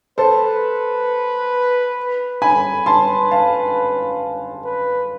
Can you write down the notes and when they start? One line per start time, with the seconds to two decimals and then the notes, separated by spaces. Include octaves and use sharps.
0.18 A4 B4 C5
2.42 G#5 B5
2.86 B4 A5 C6
3.31 F5 A5
4.65 B4